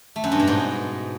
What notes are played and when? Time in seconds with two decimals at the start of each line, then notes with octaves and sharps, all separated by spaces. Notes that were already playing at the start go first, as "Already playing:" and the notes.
0.16 A3
0.24 F#2
0.32 G2
0.40 B2
0.47 G#2